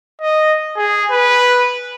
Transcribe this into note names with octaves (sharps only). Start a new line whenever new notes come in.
D#5
G#4
B4